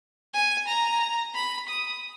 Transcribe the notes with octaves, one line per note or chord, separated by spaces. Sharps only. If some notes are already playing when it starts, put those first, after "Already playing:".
G#5
A#5
B5
D#6